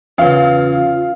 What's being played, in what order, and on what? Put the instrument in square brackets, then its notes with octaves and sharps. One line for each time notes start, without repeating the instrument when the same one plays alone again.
[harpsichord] E2 C#3 [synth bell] C#4 B4 [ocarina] F4 [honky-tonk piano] F5